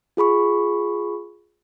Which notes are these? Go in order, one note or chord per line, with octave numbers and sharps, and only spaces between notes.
F4 G#4 B5 C#6